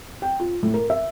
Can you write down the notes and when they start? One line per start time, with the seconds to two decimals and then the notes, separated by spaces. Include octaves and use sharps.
0.22 G5
0.40 F4
0.63 A2
0.74 A#4
0.90 E5